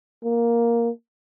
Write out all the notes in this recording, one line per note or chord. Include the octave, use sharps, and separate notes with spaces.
A#3